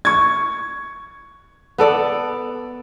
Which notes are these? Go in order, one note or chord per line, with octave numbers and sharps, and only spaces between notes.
C#6 G#6
B3 A4 D5